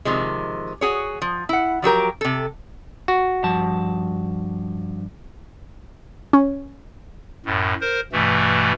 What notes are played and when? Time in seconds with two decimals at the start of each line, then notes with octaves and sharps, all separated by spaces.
0.05 C3 D#3 F3 G#3
0.81 F#4 G#4 C#5
1.22 F3
1.49 E4 F#5
1.82 F3 F#3 G4 A#4
2.21 C3 A4
3.08 F#4
3.43 G2 F3 A5
6.33 C#4
7.46 F#2 A2
7.81 A#4 C5
8.13 G2 B2 E3 A3